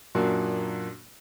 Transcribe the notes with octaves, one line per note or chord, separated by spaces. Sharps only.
F#2 A#2 A#3 D4 F#4